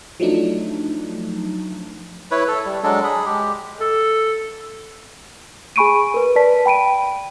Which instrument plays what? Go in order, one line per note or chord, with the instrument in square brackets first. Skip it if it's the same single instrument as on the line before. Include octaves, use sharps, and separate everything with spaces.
[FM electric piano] F3 F#3 A3 D4 D#4
[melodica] E4 B4 C#5
A4
G3
F#3 G#3 D4 A4
G#4 B5
G#3 G4
[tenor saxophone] A4
[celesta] G#4 G#5 B5 C#6 D7 D#7
A#4 B4
B4 D5 A5 B6
G5 B5 D7 D#7